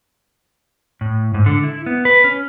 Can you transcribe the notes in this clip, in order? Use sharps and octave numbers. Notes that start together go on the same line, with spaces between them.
A2
G#2
D3
E4
B3
B4
C#4